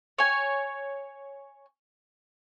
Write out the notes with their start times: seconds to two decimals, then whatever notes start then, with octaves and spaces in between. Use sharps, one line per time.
0.18 C#5 G#5